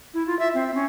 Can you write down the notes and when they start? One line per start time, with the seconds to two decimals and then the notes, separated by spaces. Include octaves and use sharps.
0.14 E4
0.27 F4
0.39 E5
0.54 C4
0.75 C#4